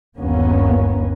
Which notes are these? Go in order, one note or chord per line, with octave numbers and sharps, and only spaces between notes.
G1 D#2 A#3 B3 C#4